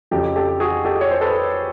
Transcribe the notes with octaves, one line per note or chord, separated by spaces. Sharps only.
F2 C#3 F#3 G4 A4
G4 A4
F#4 G#4
G4 A4
C#5
C5
A4 B4